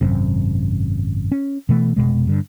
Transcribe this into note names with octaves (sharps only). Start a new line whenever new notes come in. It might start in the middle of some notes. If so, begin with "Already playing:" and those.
G#1 F#2 C3
C#4
B2 E3 A3
F1 E2 B2 G#3
G2 D3